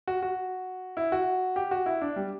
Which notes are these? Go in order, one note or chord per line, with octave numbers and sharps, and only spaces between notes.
F#4
F#4
E4
F#4
G4
F#4
E4
D4
G3